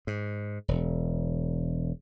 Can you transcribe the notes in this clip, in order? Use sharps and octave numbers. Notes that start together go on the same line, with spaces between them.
G#2
E1